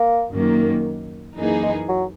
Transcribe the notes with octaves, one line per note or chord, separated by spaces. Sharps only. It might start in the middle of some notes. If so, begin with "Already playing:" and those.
Already playing: A#3
F#2 D#3 A#3
F#2 E3 A#3 D#4 G#4
G#3
F#3